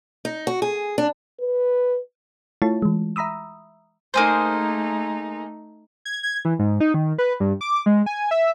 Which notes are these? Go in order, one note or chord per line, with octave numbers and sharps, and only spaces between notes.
D#4
F#4
G#4
D4
B4
A3 E4 F4 C#5 A5
E3 G#3
E5 A#5 B5 D#6 E6
A3 A#3 D#4 G#4 C5
G#6
G#6
E3
G#2
D#4
D#3
B4
G2
D6
G#3
G#5
E5